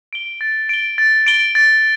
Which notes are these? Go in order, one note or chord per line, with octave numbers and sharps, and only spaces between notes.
D7 G7
A6
D7 G7
A6
D7 G7
A6